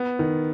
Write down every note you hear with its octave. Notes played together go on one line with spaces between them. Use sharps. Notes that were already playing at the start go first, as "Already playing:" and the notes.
Already playing: B3
D#3